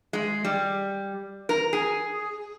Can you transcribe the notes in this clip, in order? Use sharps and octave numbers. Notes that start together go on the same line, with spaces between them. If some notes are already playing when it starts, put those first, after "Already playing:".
G#3
G3
A#4
G#4